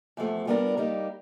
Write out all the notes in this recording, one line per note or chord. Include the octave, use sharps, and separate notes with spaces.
E2 C3 F3 A3
G3 B3 D4 F4 A#4
G3 A#3 D#4 G4